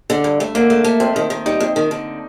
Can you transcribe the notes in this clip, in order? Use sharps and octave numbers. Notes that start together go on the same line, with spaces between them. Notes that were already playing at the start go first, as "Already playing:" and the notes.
D3
G2
A3
D3 A#3
A3
A3
F2 C4
D#3
D#3
G3 D#4
F2
D#3
D3